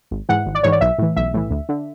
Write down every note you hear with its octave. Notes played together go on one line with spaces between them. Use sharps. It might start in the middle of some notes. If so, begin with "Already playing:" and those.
G#1
G#2 E3 F#5
G#1
D5
G#2 E3 C#5
D5
B1 E5
A2 E3
B1 E5
A2 E3
D2
D3